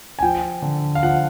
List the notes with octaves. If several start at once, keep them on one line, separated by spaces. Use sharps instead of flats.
G#5
F3 G5
D3
F5
F3 F#5